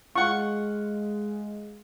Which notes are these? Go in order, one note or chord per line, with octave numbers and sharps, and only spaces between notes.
G#3 F4 F#5 C#6